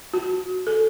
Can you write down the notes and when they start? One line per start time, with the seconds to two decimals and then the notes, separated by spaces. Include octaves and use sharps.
0.14 F#4
0.67 A4